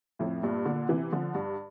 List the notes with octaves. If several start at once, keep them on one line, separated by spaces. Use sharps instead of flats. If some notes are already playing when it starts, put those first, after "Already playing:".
F2 A2
G2 A#2
A#2 D3
C3 E3
D3 F3
G2